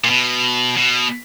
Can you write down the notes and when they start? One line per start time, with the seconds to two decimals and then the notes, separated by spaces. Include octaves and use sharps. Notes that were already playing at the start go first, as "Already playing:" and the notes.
0.04 A#2
0.10 B2
0.77 B2